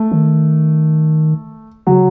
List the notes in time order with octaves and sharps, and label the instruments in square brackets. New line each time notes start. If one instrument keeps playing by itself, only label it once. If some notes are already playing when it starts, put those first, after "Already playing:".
Already playing: [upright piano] A3
[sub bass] D#3
[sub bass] C#3 [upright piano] F#3